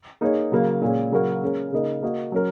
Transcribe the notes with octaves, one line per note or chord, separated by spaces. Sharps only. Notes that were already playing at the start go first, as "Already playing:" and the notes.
A#3 D#4 G#4 C#5
C#3 F#3 A#3
A#2 G#3 C#4
C#3 F#3 A#3 F#4 A#4
G#3 C#4 A#4
C#3 A#3 D#4 A#4 D#5
A#3 F#4 D#5
F#3 C#4 A#4